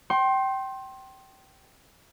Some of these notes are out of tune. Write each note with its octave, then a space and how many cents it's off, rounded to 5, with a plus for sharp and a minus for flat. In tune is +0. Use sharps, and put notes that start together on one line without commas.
G5 -20 C6 +25